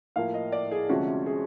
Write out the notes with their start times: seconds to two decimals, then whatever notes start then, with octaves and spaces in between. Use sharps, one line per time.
0.16 A2 F3 A#3 F5
0.34 D#5
0.52 D5
0.71 G#4
0.89 D2 C3 F3 G#3 C#4 F#4
1.26 G#4